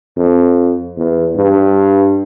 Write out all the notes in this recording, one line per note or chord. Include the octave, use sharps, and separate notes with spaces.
F2
E2
G2